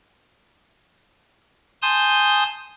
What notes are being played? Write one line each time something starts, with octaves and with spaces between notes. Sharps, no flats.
G#5 A5 C6 D#6 G6